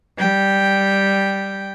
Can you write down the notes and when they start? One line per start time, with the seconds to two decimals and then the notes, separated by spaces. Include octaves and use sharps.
0.16 G3 G5